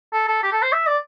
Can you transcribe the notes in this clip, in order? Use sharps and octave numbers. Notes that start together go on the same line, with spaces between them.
A4
A4
G4
A4
C5
E5
D5